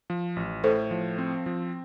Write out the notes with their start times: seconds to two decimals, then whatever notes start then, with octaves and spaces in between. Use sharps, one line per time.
0.10 F3
0.36 A1
0.64 A2 A4 C5
0.91 F3
1.18 C4
1.46 F3